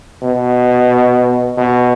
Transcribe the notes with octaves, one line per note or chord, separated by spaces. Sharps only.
B2
B2